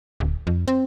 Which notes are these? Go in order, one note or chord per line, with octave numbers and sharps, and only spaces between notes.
D1
F2
C4